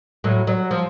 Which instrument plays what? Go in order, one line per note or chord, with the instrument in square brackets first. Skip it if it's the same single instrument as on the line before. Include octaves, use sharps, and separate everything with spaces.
[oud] A2 F#3
F#3
F3